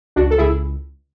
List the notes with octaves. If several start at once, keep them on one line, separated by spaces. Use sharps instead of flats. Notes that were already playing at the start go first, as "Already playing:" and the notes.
C#2 D4 F#4
A4
C#2 E4 G#4